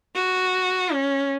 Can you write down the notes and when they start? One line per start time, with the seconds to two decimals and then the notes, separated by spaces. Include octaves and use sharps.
0.15 F#4
0.93 C#4